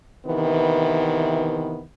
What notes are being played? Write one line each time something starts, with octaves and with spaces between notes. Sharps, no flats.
C3 D#3 E3 B3